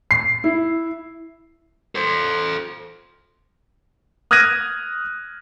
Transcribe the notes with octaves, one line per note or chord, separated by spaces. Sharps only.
C7
E4
A4 C5
D#6 F6 F#6 G#6 A#6 D#7